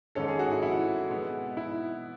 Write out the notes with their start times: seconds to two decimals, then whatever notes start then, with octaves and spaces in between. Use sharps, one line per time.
0.15 G#2 D#3 G#3 C#4 A4
0.28 G#4
0.39 F#4
0.52 E4
0.62 E4
1.10 B2 G#3 B3
1.57 E4